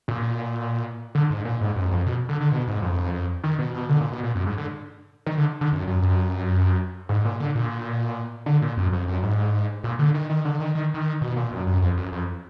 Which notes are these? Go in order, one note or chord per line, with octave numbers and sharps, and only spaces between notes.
A#2
D3
G#2
A#2
G#2
F#2
F2
B2
D3
D3
B2
G#2
F2
D#3
B2
B2
D3
A#2
B2
A#2
F#2
G#2
D3
D#3
D3
D3
F#2
F#2
F#2
G#2
A#2
D3
A#2
D3
A#2
F#2
F2
F#2
G#2
A#2
D3
D#3
D#3
D3
D#3
D#3
D#3
B2
A#2
F#2
F#2
F2
F#2
F2